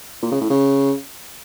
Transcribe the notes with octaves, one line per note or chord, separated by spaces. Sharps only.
A#2
C#3
A2
C#3